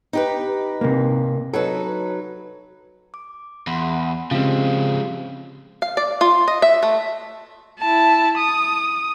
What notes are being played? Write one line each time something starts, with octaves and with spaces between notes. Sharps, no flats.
D#4 G4 B4
C3 A#3
F#3 D#4 A4 B4
D6
E2 F#5 B5 C6
C#3 F3 G#3 C4 G4 F5
F5
D5
F4
D#5
E5
A3
E4 A5
D#6